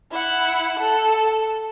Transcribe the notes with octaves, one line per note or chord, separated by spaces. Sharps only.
E4 F#5
A4